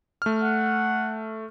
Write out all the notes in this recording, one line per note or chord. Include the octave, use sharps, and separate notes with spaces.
A3 F6
F#5